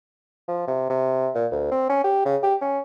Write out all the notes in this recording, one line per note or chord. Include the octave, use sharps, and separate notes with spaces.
F3
C3
C3
A#2
D2
C4
C#4
G4
C#3
G4
C#4